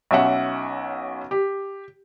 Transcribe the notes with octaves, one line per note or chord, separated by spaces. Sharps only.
B1 C#4 E5 F#5
G4